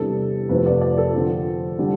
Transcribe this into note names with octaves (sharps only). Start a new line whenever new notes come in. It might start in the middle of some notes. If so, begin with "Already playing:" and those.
Already playing: E2 C3 G3 D4 A4
F2 C3 F3 A3 C4 B4
D5
D5
A4
D3 F3 C4
D3 G3